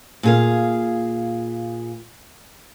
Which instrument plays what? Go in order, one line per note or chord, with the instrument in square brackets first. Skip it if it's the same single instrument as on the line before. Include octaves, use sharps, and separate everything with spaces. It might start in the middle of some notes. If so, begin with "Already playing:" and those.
[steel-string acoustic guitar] A#2 G#4 F5